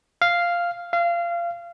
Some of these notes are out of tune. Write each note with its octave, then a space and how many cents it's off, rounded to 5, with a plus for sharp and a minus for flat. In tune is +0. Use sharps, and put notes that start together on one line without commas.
F5 -5
F5 -25